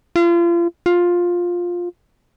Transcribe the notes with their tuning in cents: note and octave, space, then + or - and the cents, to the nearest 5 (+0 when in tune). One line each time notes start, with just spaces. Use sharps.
F4 -35
F4 +10